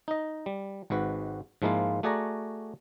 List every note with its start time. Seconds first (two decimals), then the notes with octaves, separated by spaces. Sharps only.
0.08 D#4 D#5
0.46 G3
0.90 G#1 G#2 F#4 B4
1.62 G#2 F3 G#3 A#3 E4 F4
2.03 A3 F#4 G#4 D5 F#5 A#5